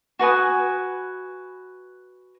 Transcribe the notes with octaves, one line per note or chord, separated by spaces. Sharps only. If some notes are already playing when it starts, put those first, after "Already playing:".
F#4 B4 G#5 D#6